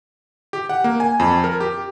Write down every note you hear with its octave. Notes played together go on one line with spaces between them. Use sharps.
G4
F#5
A#3
G#5
F2
A#4
G4